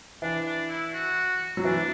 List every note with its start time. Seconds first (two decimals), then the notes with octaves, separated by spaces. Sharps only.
0.22 E3 D4
0.46 D4
0.69 E4
0.94 F#4
1.57 F#3
1.64 E3 D4